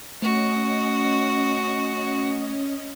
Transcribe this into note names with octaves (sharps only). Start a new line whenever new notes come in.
A3 C#4 F#4 D#5